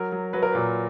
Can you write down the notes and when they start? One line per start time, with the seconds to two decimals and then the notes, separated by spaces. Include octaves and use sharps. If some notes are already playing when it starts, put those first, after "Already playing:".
Already playing: F#3 A#4
0.12 F#3
0.33 F#3 B4
0.43 A#4
0.52 A#2 B4